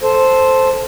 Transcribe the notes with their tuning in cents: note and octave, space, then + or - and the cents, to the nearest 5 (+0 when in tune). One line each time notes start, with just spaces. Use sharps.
A4 +0 C5 +0